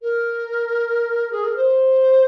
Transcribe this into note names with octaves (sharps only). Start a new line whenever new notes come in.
A#4
G#4
A#4
C5